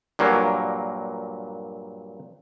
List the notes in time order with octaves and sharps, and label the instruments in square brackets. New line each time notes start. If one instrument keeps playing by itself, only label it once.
[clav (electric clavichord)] G2 A#2 F#3 A#3